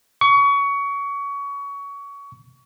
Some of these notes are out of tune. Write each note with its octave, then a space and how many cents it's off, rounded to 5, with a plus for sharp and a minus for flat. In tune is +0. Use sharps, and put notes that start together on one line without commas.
C#6 +25